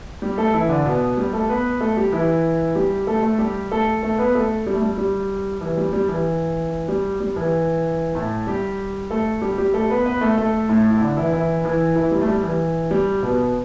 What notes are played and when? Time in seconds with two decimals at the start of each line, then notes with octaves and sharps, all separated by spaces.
0.22 G3 G4
0.38 A3 A4
0.54 E3 E4
0.69 D3 D4
0.85 B2 B3
1.17 G3 G4
1.33 A3 A4
1.49 B3 B4
1.80 A3 A4
1.97 G3 G4
2.13 E3 E4
2.75 G3 G4
3.07 A3 A4
3.23 A3 A4
3.39 G3 G4
3.72 A3 A4
4.02 A3 A4
4.18 B3 B4
4.35 A3 A4
4.67 G3
4.74 A3
4.82 G3
4.98 G3
5.61 E3
5.77 G3
5.93 G3
6.08 E3
6.88 G3
7.20 G3
7.36 E3
8.15 A2 A3
8.47 G3 G4
9.11 A3 A4
9.42 G3 G4
9.58 G3 G4
9.74 A3 A4
9.90 B3 B4
10.06 B3 B4
10.21 A3 A4
10.37 A3 A4
10.69 A2 A3
10.90 E4
11.01 D3 D4
11.17 E3 E4
11.33 E3 E4
11.64 E3 E4
11.96 E3 E4
12.11 G3
12.21 A3
12.27 G3
12.43 E3
12.91 G3
13.23 B2 B3